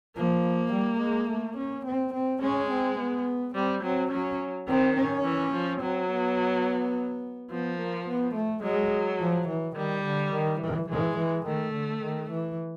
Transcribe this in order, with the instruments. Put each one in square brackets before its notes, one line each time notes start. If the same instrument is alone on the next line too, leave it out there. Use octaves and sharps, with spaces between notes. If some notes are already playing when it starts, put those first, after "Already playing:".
[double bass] F3 [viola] A#3
[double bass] G3
G#3
A3
C#4
C4
C4
[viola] G#3 [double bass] C#4
[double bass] C4
B3
[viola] G3 [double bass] C4
[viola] F#3 [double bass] C4
[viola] F#3 [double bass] C#4
[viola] D#3 [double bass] C4
[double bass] C#4
[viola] E3
F3
[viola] F#3 [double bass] C4
[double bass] B3
[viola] F3 [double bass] B3
[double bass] A#3
B3
A3
[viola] F#3 [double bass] G#3
[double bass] F3
E3
[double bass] D#3 [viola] G3
[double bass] D3
D#3
E3
[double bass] E3 [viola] G#3
[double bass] E3
[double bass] D#3 [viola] A3
[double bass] D3
D#3
E3